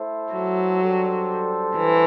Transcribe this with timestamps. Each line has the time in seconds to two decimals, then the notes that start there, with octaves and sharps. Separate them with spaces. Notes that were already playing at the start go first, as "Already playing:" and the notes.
Already playing: A3 E4 A4 C5
0.33 F#3
0.80 G3 D4 A4 C5
1.76 E3